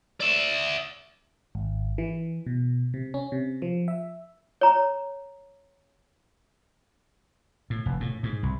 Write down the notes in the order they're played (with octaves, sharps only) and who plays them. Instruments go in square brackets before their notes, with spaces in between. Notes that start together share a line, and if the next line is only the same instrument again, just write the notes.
[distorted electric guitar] D5 E5
[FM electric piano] G#1
E3
B2
C3
C#4
C3
F3
E5
[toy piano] C#5 A#5
[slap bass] A2
F1
A2
G#2
C2